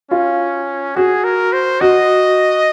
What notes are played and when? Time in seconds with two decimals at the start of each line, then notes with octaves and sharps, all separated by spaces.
0.10 C#4 F4
0.96 F#4 G#4
1.24 A#4
1.53 C5
1.81 F#4 D#5